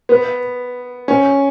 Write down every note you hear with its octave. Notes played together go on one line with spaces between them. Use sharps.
B3
C#4